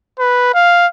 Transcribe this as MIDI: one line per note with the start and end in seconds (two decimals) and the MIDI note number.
0.19 0.53 71
0.54 0.87 77